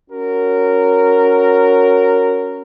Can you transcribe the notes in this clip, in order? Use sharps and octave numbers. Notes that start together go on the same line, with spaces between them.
C#4 F#4 A#4